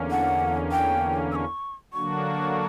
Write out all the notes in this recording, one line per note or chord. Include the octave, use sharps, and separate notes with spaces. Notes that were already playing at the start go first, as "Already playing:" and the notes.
Already playing: E2 D3 A#3 C#4
F#5
G5
E6
C#6
D3 F#3 A#3 D4 F#4 C#6